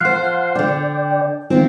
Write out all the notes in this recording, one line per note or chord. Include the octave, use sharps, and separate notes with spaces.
F3 C5 F5 F#5 C6
D3 D4 D5 G5
D#3 F3 C4 E4 F4